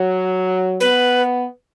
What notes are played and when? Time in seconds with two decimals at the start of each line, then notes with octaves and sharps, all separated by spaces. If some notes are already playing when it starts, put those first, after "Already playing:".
Already playing: F#3
0.80 B3 B4